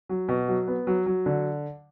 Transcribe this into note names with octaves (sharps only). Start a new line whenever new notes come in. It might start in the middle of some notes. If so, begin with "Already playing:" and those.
F#3
B2
F#3
B3
F#3
F#3
D3